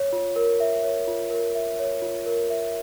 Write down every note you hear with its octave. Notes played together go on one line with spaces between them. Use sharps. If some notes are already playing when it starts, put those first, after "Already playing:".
Already playing: C#5
F4
A#4
E5
C#5
F4
A#4
E5
C#5
F4
A#4
E5